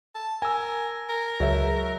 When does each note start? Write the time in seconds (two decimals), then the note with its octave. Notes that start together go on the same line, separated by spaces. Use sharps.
0.15 A5
0.42 A#4 G#5 E6
1.09 A#4
1.40 C#2 F#3 C#5 E5